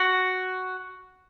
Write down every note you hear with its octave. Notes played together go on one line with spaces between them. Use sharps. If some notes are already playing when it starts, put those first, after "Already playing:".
Already playing: F#4